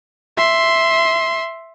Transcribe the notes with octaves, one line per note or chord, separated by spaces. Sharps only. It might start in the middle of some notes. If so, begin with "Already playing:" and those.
E5 C6